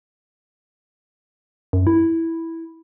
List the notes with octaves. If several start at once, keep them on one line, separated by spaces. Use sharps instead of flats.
F#2
E4